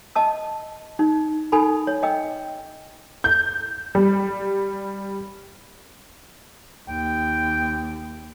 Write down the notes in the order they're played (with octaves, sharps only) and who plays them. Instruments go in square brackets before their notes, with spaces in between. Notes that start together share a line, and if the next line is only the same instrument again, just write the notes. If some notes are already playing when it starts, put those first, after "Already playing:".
[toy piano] D#5 A5 E6
D#4
D#4 A4 G#5 B5
C#5
D#5 G5 E6
[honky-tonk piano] G6
G3
[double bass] D#2 [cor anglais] G5